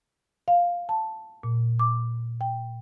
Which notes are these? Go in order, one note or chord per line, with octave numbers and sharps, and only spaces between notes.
F5
A5
A#2
D6
G5